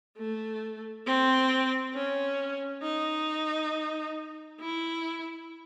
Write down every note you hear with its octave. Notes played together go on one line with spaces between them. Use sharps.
A3
C4
C#4
D#4
E4